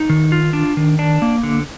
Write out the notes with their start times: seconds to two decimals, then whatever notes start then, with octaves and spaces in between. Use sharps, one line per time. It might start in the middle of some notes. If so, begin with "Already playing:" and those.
Already playing: D#4
0.09 D#3
0.32 F4
0.53 D4
0.77 D#3
0.99 D4
1.22 A#3
1.43 D3